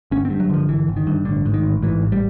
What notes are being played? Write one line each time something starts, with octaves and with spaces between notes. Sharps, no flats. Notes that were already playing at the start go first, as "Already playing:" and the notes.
G1 C#4
C4
G2
F#3
D3 F3
G1 E3
G1
D#3
G2
A1 D3
G#2
D#3
A1
G#2 E3
A1
G3